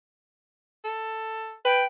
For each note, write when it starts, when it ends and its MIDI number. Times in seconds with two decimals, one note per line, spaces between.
0.85 1.54 69
1.65 1.83 71
1.65 1.85 79